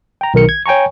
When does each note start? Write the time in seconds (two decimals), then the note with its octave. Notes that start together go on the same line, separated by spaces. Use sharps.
0.21 G5 A#5
0.34 B1 D#3 A#4 C#7
0.49 G#6
0.66 C#5 G5 G#5 A#5 C#6